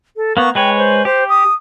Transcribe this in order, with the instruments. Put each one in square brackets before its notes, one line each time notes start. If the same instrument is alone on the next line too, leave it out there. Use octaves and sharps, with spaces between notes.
[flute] A4
[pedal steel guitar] A#3 B3 [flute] C#6
[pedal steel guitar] G#3 B4 C#5 [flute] G5
[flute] C5
[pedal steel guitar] G4 [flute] C5
[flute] D#6